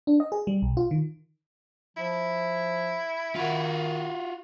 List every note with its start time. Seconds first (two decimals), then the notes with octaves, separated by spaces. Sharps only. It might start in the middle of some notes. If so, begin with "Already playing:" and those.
0.07 D4
0.20 D#5
0.32 G#4
0.47 G3
0.62 B1
0.77 F4
0.91 D#3
1.97 F3 E4
3.35 D#3 F4 F#4